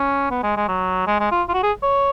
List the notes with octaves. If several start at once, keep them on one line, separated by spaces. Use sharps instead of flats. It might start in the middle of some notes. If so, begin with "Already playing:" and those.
Already playing: C#4
B3
G#3
G#3
F#3
G#3
G#3
F4
F4
F#4
G#4
C#5